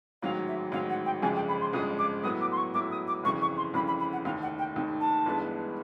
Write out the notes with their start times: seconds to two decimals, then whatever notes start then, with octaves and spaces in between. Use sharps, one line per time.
0.22 A1 G#2 D#3 F#3 F5
0.47 E5
0.72 A1 G#2 D#3 F#3 F5
0.89 F#5
1.06 G5
1.22 G1 F2 C#3 F3 G#3 G#5
1.35 G5
1.48 B5
1.61 C6
1.73 G1 F2 C#3 F3 G#3 D#6
1.98 D6
2.23 A2 F#3 B3 E4 D#6
2.41 D6
2.52 C6
2.57 C#6
2.74 A2 F#3 B3 E4 D6
2.91 D#6
3.07 D6
3.23 G1 F2 C#3 E3 C#6
3.41 C#6
3.57 C6
3.74 G1 F2 C#3 E3 B5
3.87 B5
3.99 B5
4.12 F#5
4.25 F1 D#2 D#3 F5
4.42 F#5
4.59 G5
4.75 F1 D#2 D#3
5.00 A5
5.26 G1 G2 E3 G#3 B3